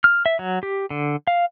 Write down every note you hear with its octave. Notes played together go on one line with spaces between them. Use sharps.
F6
E5
F#3
G4
D3
F5